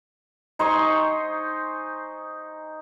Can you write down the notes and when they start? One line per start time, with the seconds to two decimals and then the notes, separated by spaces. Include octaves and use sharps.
0.59 D#4 C5 G#5 C#6